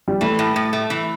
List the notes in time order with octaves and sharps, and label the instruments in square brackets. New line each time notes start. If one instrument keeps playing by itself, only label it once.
[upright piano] G3
[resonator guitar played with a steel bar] E3 [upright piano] A3
[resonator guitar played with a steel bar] A2
A2
A3
E3